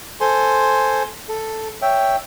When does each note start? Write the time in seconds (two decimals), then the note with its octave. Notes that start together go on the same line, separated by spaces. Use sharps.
0.21 A4 C5 G#5 C6
1.29 A4
1.82 C#5 E5 G5